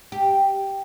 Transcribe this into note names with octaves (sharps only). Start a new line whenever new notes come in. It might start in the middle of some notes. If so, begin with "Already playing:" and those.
G4